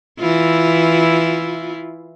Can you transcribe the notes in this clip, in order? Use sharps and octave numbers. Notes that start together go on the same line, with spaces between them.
E3 E4 F4